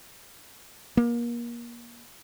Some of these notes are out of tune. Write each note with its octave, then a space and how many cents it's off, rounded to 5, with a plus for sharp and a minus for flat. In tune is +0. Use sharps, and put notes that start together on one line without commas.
A#3 +30